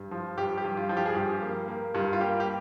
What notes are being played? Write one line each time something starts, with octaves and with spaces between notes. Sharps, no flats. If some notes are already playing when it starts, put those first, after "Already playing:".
Already playing: G2
F3
G2 G4
G4
G2
F4
F3
G4
G#4
G2 G4
A#3
A#3
G2 F4
F4
A#3 G4
G4